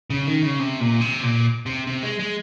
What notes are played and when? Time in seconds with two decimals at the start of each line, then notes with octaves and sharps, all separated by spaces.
0.10 C#3
0.26 D#3
0.43 C#3
0.59 C3
0.80 A#2
1.01 C3
1.23 A#2
1.66 C3
1.87 C3
2.03 G#3
2.19 G#3